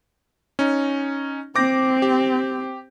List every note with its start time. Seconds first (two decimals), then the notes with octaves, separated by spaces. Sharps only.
0.59 C#4 D#4
1.56 C4 D6 G6 A#6
2.02 G4